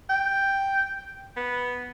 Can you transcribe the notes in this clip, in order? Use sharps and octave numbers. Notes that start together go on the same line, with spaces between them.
G5
B3